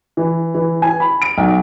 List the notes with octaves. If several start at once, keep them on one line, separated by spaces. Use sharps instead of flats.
E3
E3
G#5
B5
D7
B1